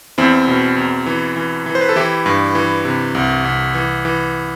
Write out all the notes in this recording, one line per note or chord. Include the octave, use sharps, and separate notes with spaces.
E2 C4 E4
B2
E2
E3
E3
E3
C5
B4
A4
E3 E4 G4
G2
E3
C3
C2
C2
E3
E3